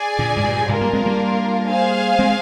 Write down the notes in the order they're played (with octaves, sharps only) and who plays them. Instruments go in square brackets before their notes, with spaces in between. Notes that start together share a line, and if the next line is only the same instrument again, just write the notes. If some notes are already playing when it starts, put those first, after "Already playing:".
Already playing: [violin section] G#4 D5 G#5
[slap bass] A#2 D3
G#2
G2 A#2
[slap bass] G#2 C3 [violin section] D4 F4 A#4
[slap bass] G3 A#3
G#3 C4
G3 A#3
[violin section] G#4 C5 F5 G#5
[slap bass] G#3 C4